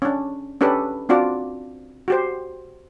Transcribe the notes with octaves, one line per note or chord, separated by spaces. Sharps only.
C#4 D4
C#4 D4 G4 A4 B4
C4 D4 F4 F#4 D5
F#4 G4 C5